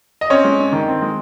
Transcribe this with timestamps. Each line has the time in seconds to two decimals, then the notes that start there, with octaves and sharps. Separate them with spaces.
0.21 D#5
0.30 C4 C#4 C#5
0.44 G#3
0.58 G2
0.72 D#3
0.88 C4
1.02 G#3